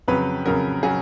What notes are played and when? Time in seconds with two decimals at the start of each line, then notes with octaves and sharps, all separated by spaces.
0.08 F2 C#3 F#3 B4
0.45 F2 C#3 F#3 A#4
0.83 C#3 F#3 G#4